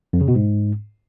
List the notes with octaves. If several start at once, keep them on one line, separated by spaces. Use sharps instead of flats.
F2
C#3
B2
G#2